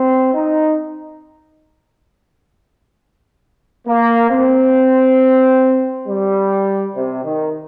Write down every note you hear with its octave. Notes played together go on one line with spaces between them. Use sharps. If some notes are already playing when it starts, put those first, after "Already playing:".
Already playing: C4
D#4
A#3
C4
G3
C3
D#3